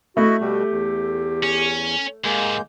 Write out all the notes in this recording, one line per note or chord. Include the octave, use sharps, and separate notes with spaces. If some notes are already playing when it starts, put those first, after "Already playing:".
A3 E4 F#4 D#5 B5
B2 G3 F#4 G4
E2
C#4
D#2 G#2 G#3 A#3 G6